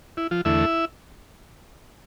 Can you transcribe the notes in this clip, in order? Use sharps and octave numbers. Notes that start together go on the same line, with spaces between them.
E4
F3 F4
E2 D3 A3 E4 E5